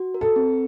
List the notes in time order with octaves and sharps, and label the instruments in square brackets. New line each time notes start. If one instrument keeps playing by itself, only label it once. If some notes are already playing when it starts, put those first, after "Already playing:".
Already playing: [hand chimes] F#4
A#4
[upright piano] A4
[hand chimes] C4